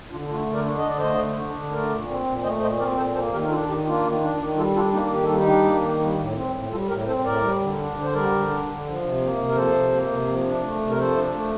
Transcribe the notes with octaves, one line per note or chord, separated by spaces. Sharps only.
D3 D4 F4
A3 D4 F4
D3
A#4 D5
D4
D#5
D3 D5
A3 C5 D#5
D3
D4
D3
A3 A#4 D5
A#2
C4
A#2
A3 C5 D#5
A#2 C5 D#5
C4 A#4 D5
A#2 A4 C5
A#3 A4 C5
D#3 G4 A#4
A#4
D4 F4 A4
D#3 D#4 G4
A#3 D4 F4
D#3
D4
D#3
G3 F4 A4
D4 F4 A4
A#3 D#4 G4
D#3 G4
G3 A4
D#4 G4
D4
A#3
D#3
G3
A2
C4
A2
G3 F4 A4
A2 G4 A#4
C4 A4 C5
A2 A#4 D5
G3
D3
D4
D3
C5
G3 A#4 D5
D3
D4
D3
F3
C3
A#3
C3
A#4
F3 A4 C5
C3
A#3
C3
F3
D4
A3
C3
A#4
F3 A4 C5
D4
A3